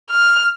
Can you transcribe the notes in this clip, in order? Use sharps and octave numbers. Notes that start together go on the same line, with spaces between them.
F6